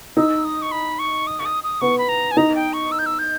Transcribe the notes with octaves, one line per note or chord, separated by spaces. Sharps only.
D#4 E6
D#6
C#6
B5
C#6
D#6
C#6
D#6
D#6
B3 C#6
B5
A#5
G#5
D#4 A#5
G5
C#6
E6
G6
E6
G6